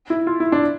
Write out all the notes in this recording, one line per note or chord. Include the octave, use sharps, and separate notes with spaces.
E4
F4
E4
D4